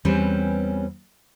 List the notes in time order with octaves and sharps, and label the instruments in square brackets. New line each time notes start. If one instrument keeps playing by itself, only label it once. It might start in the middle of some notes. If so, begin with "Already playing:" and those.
[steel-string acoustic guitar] E2 G3 C4 C#4 B4